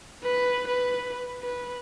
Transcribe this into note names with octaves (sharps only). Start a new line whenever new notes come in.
B4
B4
B4